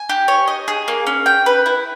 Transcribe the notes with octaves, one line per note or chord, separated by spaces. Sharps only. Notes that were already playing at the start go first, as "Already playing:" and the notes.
Already playing: G#5
G4
C#5
D#5
G#4
A#3
C#4
G5
B4
E4